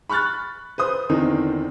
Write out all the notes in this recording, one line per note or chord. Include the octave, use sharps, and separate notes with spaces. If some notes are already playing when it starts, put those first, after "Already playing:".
B5 C#6 F6 F#6 A6
B4 C5 D#6
E2 D3 D#3 C4 D#4